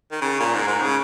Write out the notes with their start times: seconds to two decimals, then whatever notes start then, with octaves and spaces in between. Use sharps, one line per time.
0.11 D#3
0.21 C#3
0.40 A#2
0.54 G#2
0.67 G#2
0.81 C#3